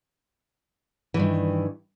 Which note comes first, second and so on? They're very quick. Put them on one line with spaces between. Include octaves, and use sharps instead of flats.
E3 G2 D#3